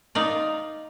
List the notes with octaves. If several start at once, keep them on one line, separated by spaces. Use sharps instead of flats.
D#4 F4 D5